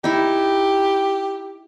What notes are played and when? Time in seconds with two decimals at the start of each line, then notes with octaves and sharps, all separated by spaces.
0.04 D#4 E4 G4